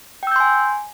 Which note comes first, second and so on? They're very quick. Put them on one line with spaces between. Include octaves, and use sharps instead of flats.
G5 E6 G6 C6 G#5